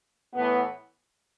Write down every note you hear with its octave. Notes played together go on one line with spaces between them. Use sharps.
A2 E3 B3